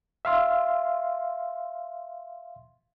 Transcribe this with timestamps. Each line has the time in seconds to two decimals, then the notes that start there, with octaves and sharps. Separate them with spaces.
0.25 E5 F5 C6